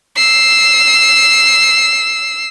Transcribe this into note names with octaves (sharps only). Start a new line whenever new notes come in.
E6 C7